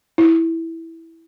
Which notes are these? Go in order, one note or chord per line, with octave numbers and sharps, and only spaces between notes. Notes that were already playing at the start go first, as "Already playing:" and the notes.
E4